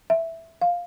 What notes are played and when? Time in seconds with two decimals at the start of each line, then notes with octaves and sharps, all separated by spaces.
0.10 E5
0.62 F5